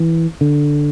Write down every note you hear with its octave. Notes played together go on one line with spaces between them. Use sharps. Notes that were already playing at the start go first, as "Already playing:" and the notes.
Already playing: E3
D3